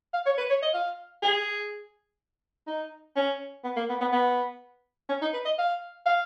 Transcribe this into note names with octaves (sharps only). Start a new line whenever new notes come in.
F5
C#5
B4
C#5
D#5
F5
G#4
D#4
C#4
B3
A#3
B3
B3
B3
C#4
D#4
B4
D#5
F5
F5